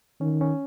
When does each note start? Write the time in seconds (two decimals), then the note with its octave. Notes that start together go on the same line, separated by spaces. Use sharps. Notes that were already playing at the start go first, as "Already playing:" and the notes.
0.20 D#3 C#4
0.41 C#4